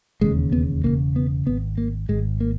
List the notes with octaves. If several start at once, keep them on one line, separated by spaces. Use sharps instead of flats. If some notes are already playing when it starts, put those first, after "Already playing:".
E1 D#2 C#3 G#3
B3
E1 D#2 C#3 A#3
B3
G#1 G#2 B3
A#3
G#1 G#2 G#3
A#3